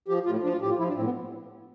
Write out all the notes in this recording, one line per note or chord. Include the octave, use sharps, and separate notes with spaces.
F3 G4
A2 F4
F3 D4
F4
A2 G4
F4
F3 E4
D4
A2 C4
B3